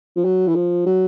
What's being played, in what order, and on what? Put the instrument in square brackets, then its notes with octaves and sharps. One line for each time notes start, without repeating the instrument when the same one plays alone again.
[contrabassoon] F3
F#3
E3
F3
F#3